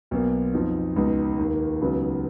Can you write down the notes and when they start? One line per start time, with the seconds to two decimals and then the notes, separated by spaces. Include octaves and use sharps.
0.11 B1 B2 A#3
0.54 F2 F3 B3 D#4
0.96 C#2 B2 G#3 D#4
1.38 D#2 D#3 A#3
1.81 C#2 C#3 F#3 B3 D#4